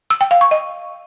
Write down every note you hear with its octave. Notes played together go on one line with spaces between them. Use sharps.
E6
G5
F5
C#6
D#5